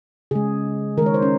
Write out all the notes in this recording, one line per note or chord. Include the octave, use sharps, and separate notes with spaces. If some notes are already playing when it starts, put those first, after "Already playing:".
C#3 G#3 G#4
D#3 G#3 A#4 C#5
C5
C#4